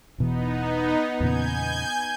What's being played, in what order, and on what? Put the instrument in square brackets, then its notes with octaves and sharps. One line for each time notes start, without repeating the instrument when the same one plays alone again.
[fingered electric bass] E1 B2 E3 [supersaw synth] B3 D#4
[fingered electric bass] E2 A#2 C#3 [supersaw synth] G#5 G6 G#6